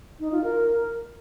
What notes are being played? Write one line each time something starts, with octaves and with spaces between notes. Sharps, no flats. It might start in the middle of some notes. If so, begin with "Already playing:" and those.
D#4
F4
A#4